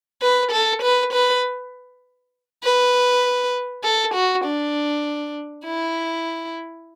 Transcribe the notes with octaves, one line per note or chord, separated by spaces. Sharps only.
B4
A4
B4
B4
B4
A4
F#4
D4
E4